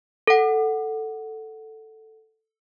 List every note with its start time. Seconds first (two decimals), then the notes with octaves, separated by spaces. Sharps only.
0.27 A4 F#5